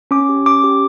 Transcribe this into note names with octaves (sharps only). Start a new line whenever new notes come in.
C#4 D6
G4
C#4 D6
G4